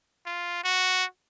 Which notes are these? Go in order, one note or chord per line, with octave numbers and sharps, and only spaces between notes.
F4
F#4